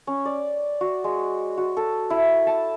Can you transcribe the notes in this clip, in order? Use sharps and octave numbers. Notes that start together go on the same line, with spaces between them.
C#4
D5
F#4
G#3
F#4
A4
E4
A5